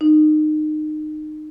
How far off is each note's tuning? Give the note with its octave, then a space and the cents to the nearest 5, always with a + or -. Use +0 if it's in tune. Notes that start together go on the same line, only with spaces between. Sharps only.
D#4 -25